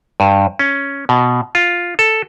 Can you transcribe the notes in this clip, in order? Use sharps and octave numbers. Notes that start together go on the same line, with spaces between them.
G2
C#4
B2
F4
A4